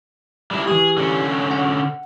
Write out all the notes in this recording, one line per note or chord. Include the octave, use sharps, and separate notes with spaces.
G3 D4 E4
E3 G4 G#4
D3 C#4
F#5